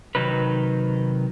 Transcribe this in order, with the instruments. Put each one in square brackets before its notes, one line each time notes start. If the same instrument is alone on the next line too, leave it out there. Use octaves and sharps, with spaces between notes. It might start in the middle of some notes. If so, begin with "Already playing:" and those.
[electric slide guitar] C3 D#3 F#3 D#4 B4